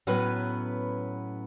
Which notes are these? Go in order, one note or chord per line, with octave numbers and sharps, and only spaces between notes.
A2 F#3 B3 C#4 B4